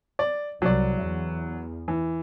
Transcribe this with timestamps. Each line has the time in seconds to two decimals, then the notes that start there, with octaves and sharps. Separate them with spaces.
0.19 D5
0.62 C2 F#3 D5
0.97 E2
1.88 E3